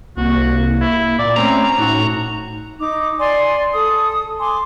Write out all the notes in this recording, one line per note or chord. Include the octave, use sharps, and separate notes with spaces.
C2 A#3 F#4
E4
A#2 D5
A3 C4 C#4 A#5
A2 D#4 F#4
D#4 D6
D5 G#5 C6
A4 D#6
G#5 C6 D6